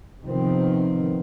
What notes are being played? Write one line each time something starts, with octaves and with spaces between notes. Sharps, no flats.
C3 D#3 F3 B3 C4